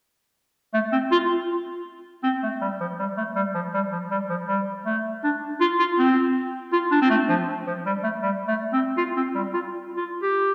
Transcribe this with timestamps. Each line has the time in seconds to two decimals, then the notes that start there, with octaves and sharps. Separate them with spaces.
0.74 A3
0.93 C4
1.12 F4
2.24 C4
2.43 A3
2.62 G3
2.81 F3
3.00 G3
3.18 A3
3.36 G3
3.55 F3
3.74 G3
3.93 F3
4.11 G3
4.30 F3
4.48 G3
4.86 A3
5.24 D4
5.61 F4
5.79 F4
5.99 C4
6.73 F4
6.92 D4
7.02 C4
7.10 A3
7.29 F3
7.67 F3
7.86 G3
8.04 A3
8.23 G3
8.48 A3
8.73 C4
8.98 F4
9.17 C4
9.35 G3
9.54 F4
9.97 F4
10.23 G4